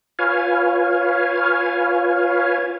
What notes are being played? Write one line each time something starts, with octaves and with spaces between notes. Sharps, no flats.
F4 B4 C#5 F5 G#5